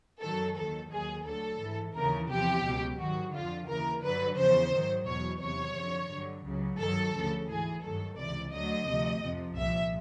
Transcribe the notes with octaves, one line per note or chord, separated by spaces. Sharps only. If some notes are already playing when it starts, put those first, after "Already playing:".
F#2 D#3 F#3 A4
D#2 D#3 F#3 A4
D#2 D#3 F#3 G#4
D2 D3 F#3 A4
G#2 E3
D#2 C#3 E3 A#4
E2 C3 F3 G4
C#2 B2 F#3
G#2 D#3 F#3 F#4
F2 D3 F3 F4
D#2 C#3 E3 A#4
G2 D3 F#3 B4
E2 C#3 F3 C5
G#2 D#3 F#3
E2 B2 F#3 C#5
E2 C3 D#3 F#3 C#5
F#2 D3 F3
G2 D3 F#3
C#2 C#3 F#3
G2 D#3 F#3 A4
D2 C#3 F3
G#2 E3 G#4
G2 D#3 F#3 A4
C#2 C3 E3 D5
D2 D3 F#3 D#5
D2 C3 F3
F2 C3 F3
C2 A#2 F3 E5